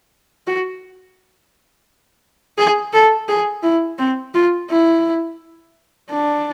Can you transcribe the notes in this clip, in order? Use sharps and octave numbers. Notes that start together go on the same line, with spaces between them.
F#4
G#4
A4
G#4
E4
C4
F4
E4
D4